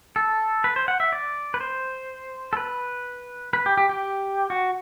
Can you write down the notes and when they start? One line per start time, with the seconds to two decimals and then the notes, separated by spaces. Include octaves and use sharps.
0.16 A4
0.64 B4
0.76 C5
0.88 F#5
1.00 E5
1.12 D5
1.54 B4
1.60 C5
2.53 A4
2.57 B4
3.53 B4
3.66 G4
3.77 G4
3.89 G4
4.50 F#4